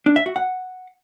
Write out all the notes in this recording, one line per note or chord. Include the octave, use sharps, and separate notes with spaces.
D4
E5
F#4
F#5